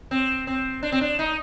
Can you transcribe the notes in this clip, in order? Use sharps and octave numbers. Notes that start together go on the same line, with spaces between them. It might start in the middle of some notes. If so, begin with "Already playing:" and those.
C4
C4
D4
C4
D4
D#4